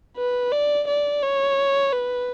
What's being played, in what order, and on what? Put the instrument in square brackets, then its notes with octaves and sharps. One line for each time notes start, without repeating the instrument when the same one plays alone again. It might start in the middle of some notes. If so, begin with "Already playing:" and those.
[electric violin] B4
D5
D5
C#5
B4